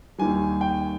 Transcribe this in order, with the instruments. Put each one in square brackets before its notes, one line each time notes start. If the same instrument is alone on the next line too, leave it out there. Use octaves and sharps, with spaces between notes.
[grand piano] D#2 D#3 G3 G#5
G5